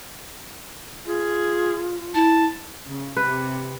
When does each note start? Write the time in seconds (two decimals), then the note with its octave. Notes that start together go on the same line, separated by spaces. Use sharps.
1.05 F4 G#4
2.15 E4 A5
2.87 C#3
3.17 C3 B4